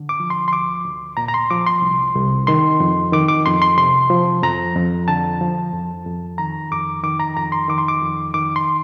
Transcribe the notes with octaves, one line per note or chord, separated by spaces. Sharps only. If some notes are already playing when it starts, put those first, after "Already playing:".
Already playing: D3
D6
F3
C6
C6
D2 D6
D2
A#2 A#5
A#5
C6
F3 D6
C6
C2
C2
D#3 C6
F2
D#3 D6
D6
F2 C6
C6
C3 C6
F3
F2 A#5
F2
D3 A5
F3
F2
F2
D#3 A#5
F2 D6
D#3 D6
A#5
F2 A#5
C6
D#3 D6
C6
D6
F2
D#3 D6
C6